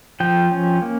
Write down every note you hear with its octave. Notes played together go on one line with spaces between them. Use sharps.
F3 G5
C#4
A#3